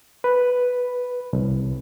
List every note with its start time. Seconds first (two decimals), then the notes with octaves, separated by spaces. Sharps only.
0.24 B4
1.33 C2